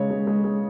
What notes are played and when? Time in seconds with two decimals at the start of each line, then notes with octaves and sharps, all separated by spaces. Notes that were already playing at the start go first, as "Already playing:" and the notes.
Already playing: C#3 G#3 C#5
0.10 G#3
0.27 G#3
0.44 G#3